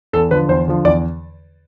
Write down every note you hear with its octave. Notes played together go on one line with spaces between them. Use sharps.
E2 A4
D3 F3 B4
E2 C5
D3 F3
E2 D5